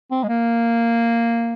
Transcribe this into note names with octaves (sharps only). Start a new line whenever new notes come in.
C4
G#3
A#3